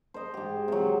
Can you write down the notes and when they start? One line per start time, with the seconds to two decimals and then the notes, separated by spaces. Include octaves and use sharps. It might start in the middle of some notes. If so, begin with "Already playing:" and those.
0.14 C5 D#5
0.34 G#2 G4
0.68 C3 F#3